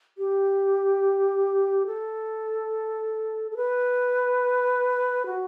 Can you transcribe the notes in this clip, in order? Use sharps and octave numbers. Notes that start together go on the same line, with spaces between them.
G4
A4
A4
B4
F#4